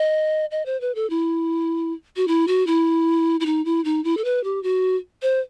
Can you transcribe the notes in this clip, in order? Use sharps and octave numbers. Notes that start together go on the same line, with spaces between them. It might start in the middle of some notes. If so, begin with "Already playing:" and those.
Already playing: D#5
D#5
C5
B4
A4
E4
F#4
E4
F#4
E4
E4
D#4
E4
D#4
E4
A4
B4
G4
F#4
C5